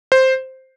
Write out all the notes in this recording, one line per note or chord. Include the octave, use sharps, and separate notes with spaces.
C5